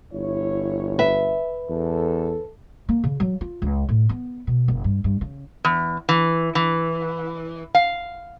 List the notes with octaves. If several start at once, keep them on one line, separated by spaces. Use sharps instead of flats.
G1 E4 C#5
B4 E5
E2 A4
A#3
C#3
F#3
F4
C#2
A2
B3
B2
F#1
G2
G2
C#3
E2
E3
E3
F5